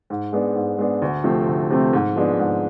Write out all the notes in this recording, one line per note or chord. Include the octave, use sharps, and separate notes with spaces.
G#2
G#3 B3 D4
G#2
G#3 B3 D4
D2
C3 F3 A3 C4
D2
C3 F3 A3 C4
G#2
F3 G#3 B3 D4
G#2